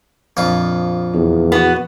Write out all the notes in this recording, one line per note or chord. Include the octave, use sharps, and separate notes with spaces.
A#1 F2 F4
E2
B3 F#4